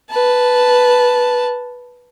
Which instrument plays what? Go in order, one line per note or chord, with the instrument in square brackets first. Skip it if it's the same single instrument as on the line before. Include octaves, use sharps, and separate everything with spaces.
[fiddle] B4 A5